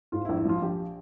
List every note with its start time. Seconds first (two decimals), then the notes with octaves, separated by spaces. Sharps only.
0.12 G#2 F4
0.25 E4
0.29 A#1
0.37 E4
0.45 F3 F4
0.61 A#1 G4